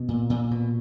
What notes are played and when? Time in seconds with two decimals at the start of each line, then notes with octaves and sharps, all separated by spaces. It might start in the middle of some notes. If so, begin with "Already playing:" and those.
Already playing: B2
0.08 A#2
0.30 A#2
0.51 B2